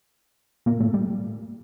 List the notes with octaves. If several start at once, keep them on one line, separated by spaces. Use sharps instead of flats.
A#2 A#3
A2 A3
G3